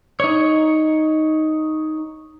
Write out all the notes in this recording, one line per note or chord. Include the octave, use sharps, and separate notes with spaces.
D#4 C#5